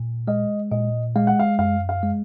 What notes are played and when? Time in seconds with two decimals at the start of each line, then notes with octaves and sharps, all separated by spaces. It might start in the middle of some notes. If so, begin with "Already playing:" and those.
Already playing: A#2
0.28 G#3 D#5
0.71 A#2 D#5
1.16 G#3 F5
1.27 F#5
1.40 F5
1.59 F#2 F5
1.89 F5
2.03 G#3